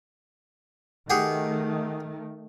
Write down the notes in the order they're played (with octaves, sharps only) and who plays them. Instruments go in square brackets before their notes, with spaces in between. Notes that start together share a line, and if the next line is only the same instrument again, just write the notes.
[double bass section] D#3 A3 [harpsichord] G4 G#4 F#5